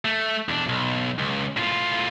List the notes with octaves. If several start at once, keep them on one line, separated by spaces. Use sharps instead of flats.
A3
E2 D4
B1
C#2
A2 F4